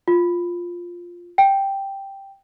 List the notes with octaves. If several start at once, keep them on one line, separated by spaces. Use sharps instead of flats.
F4
G5